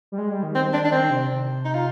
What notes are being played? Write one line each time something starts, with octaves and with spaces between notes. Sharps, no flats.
G3
G#3
G3
D#3
C4
D4
D4
D#3 C4
C3
D#4
F4